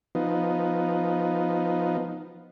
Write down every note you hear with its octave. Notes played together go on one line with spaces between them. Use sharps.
F3 B3 D#4